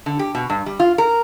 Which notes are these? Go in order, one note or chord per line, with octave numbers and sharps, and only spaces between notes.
D3
G4
B2
G2
G3
F4
A#4